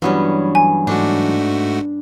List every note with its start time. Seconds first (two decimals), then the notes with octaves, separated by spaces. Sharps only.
0.02 G2 E3 F#3 G3 B3 C#4
0.55 G#5
0.87 G#2 A3 D4 F#4